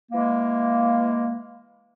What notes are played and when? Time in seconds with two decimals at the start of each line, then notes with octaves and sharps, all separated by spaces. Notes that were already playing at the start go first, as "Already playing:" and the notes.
0.12 E3 G#3 A#3